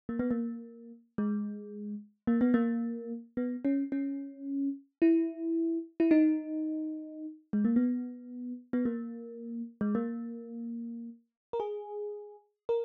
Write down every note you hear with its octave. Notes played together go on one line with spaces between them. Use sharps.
A#3
B3
A#3
G#3
A#3
B3
A#3
B3
C#4
C#4
E4
E4
D#4
G#3
A#3
B3
B3
A#3
G#3
A#3
A#4
G#4
A#4